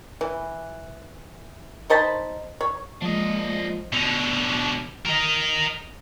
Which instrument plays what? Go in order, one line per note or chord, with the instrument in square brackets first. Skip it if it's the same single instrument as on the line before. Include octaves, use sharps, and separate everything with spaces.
[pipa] E3
D#4 C5 A5 B5
C#5
[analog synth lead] F3 [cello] G#3 A#3 [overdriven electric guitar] D4 D#5
[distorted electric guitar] B2 D3
A#4 D#5